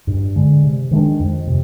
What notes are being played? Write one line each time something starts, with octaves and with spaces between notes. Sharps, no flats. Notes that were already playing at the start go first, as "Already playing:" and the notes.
G2
D3 G#3
C3
D#3 G#3 D4
F2
C3